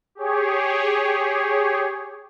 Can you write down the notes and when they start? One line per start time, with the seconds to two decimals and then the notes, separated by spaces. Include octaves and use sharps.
0.15 G4 G#4 C#5